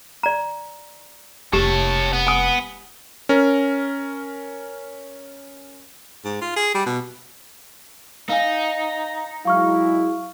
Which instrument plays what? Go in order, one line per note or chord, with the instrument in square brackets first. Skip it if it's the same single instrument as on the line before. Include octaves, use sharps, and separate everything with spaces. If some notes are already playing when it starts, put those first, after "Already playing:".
[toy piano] D5 A#5
[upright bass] F1 [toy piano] G4 [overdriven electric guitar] C#5 A5
[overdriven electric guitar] B3
[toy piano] G#5 D#6
[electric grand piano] C#4 A#4
[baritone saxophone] G#2
F4
G#4
G3
B2
[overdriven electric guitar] D#4 [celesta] F5 G#5
[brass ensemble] F#3 G#3 E4 [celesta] F5 C#6 F6